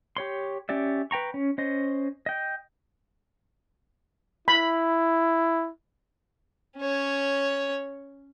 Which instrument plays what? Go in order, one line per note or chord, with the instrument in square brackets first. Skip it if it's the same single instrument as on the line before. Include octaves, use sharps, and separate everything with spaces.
[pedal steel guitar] G4 C#5 C6
C#4 G4 D5 E5
B4 G5 A#5 C#6
C#4
C#4 C5 D#5
D#5 G5
[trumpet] E4 [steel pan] B5
[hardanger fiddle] C#4 C#5